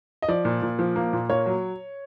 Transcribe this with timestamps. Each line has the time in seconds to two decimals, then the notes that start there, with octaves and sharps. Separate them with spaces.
0.22 D#5
0.28 F3 D5
0.45 A#2
0.62 A#2
0.79 F3
0.96 A#3
1.13 A#2
1.30 A#3 C#5
1.46 F#3